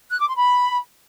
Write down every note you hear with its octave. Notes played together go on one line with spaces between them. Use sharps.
F#6
D6
C6
B5